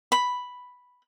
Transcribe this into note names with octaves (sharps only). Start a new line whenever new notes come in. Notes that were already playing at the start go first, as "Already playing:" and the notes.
B5